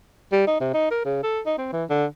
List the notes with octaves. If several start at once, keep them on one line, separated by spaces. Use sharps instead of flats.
G3
D#4
C3
D#4
A#4
C#3
A4
D#4
C4
E3
D3